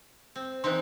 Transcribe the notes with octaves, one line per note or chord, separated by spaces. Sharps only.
C4
E3 C4 D#4 C5 C6